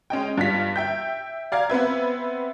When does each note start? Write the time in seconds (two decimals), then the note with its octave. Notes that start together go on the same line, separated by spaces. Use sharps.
0.10 G#3 C#4 D#5 G5
0.37 G2 F4 B6
0.76 E5 G5 G6
1.52 D5 F5 A#5 G#6
1.70 B3 C4 B4 E5